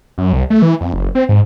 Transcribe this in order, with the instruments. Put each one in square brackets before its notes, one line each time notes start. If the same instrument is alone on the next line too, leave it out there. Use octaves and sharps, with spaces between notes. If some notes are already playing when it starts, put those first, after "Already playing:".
[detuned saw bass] F#2
C2
A3
E3
F2
F#1
C4
G#2